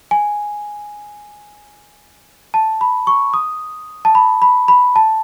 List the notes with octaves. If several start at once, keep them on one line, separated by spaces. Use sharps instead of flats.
G#5
A5
B5
C#6
D#6
A5
B5
B5
B5
A5